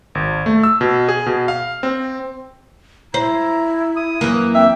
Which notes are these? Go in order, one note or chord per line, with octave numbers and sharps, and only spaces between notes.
G#1
A3
E6
B2
G#4
B2
F5
C4
E4 C5 A#5
D#6
F#2 E3 A#3
C4 E5 G5